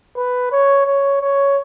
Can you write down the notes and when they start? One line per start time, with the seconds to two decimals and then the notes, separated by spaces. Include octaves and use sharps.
0.17 B4
0.52 C#5
0.86 C#5
1.21 C#5